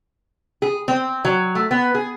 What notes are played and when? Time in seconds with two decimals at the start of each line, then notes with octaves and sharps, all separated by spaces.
0.62 G#4
0.88 C4
1.25 F#3
1.55 A3
1.71 B3
1.95 G#4